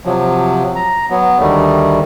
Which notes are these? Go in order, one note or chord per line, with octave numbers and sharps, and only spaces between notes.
C3 F3 F#3
A#5
F#3 B3
D2 D#3 G3 A3